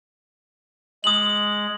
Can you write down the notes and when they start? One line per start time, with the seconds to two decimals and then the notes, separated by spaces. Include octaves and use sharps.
1.04 G#3 D#6 F#7